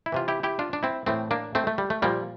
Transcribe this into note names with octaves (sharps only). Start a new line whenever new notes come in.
E4
C3 E3 F4
E4 G4
E4 G4
D4 F4
D4
C4 E4
A2 E3 A3 C4
A#3 D4
A3 C4
A3
G3
A3
A#2 F3 G3 A#3